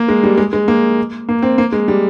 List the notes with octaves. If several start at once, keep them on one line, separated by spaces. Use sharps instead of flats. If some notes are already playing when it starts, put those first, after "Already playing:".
Already playing: A#3
G#3
G3
G#3
G#3
A#3
A#3
C4
A#3
G#3
G3